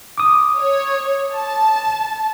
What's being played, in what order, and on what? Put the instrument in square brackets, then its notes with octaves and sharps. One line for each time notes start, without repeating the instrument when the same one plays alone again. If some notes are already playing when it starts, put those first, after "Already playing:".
[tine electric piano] D6 D#6
[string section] C#5
A5